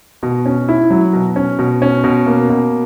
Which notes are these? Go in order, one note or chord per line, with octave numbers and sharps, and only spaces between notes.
B2
C#4
E4
F#3
B2
C#4
B2
C#4
B2
A#3
B2